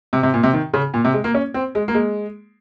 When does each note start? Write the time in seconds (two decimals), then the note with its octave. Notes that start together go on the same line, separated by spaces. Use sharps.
0.13 C3
0.23 C3
0.34 A#2
0.43 C3
0.53 D#3
0.74 C#3
0.94 A#2
1.05 C3
1.14 G#3
1.24 A#3
1.34 C#4
1.54 C4
1.75 G#3
1.88 A#3
1.94 G#3